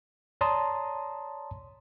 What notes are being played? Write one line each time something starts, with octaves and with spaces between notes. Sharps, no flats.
C#5 D5 A5 A#5 C6 D#6